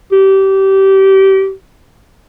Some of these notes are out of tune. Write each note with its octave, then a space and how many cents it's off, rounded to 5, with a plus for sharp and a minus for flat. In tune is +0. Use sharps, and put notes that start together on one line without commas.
G4 -25